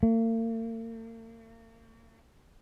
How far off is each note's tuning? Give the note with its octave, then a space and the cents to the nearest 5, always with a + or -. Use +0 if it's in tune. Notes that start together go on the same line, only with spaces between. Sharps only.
A#3 -45